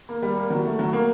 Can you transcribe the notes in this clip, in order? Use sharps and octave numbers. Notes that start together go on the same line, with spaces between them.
A#3
G3
A#3
F#3
A3
F#3
A#3